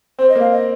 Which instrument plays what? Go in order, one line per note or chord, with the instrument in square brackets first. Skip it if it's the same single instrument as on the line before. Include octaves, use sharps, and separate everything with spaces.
[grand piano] C4 [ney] C5
[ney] D#5
[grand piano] A#3 [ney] F5
[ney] D#5